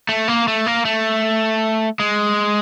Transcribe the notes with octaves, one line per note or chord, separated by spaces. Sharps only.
A3
A#3
A3
A#3
A3
G#3